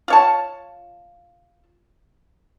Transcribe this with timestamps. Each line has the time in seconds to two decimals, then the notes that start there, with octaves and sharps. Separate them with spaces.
0.08 F4 C#5 A5